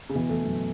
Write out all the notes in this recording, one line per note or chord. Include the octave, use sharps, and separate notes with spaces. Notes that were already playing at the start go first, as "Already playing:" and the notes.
C#3
B2 E3
E3 A3
F#2 B2